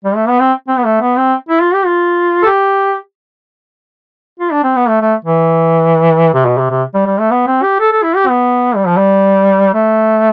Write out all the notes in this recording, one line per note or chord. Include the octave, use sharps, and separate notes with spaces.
G3
A3
B3
C4
C4
B3
A3
B3
C4
E4
F4
G4
F4
A4
G4
F4
D4
C4
B3
A3
A3
E3
C3
B2
C3
C3
G3
G3
A3
B3
C4
G4
A4
A4
E4
G4
B3
G3
F3
G3
A3